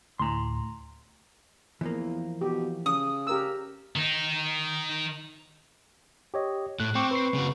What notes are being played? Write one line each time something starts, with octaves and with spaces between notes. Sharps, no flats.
D2 A2 A#5 C6
E2 E3 F3 A#3
B2 G4
C#3 D#6
G4 A#4 E6
D#3 D#4
G4 C#5 D#5
A2 F#6
C4 G5 C#6 D6
B4 C#6 C7
C#3 F#4